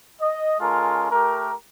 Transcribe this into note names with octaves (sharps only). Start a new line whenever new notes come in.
D#5
G#3 C#4 F4 A4 A#4
A3 G4 A#4